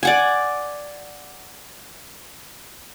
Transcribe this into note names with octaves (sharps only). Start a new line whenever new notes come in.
D5 F#5 G#5